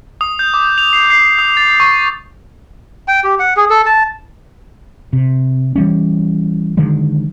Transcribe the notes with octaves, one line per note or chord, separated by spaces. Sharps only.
D#6
G6
D6
F7
C7
C7
D#6
A6
C#6
G5
G4
F#5
G#4
A4
A5
C3
E3 G3 C#4
D3 D#3 F#3 G#3